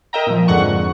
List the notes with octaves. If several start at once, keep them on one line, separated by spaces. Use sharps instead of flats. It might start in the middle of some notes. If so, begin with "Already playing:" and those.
A#4 D#5 E5 G5 A#5
A#2 F3
F2 G#2 D3 F#5 C#6
F2